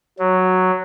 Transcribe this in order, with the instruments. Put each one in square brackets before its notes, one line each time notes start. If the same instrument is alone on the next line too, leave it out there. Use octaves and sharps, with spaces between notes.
[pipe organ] F#3 [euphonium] F#4